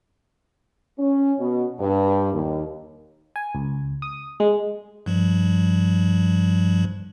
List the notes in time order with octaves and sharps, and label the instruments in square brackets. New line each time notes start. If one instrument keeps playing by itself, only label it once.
[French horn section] C#4
B2
G2
D#2
[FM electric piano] G#5
C#2
D#6
G#3
[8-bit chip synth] G2 F3 G3